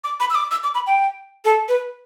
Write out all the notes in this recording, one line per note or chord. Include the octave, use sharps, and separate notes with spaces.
D6
B5
E6
D6
E6
D6
B5
G5
A4
B4